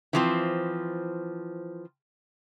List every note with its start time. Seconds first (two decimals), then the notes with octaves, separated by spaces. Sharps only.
0.13 E3 F3 C4